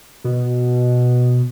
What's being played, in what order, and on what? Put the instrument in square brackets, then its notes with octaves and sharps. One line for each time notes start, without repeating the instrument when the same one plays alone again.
[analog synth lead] B2